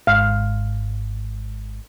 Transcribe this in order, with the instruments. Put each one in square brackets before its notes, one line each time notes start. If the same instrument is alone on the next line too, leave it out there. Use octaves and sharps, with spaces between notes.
[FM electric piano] G#1 G#2 [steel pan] F5